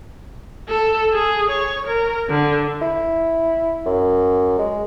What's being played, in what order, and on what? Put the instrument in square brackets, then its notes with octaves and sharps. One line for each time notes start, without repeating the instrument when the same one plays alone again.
[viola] A4
G#4
C#5
A#4
D3
[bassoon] E4
F#2
G#3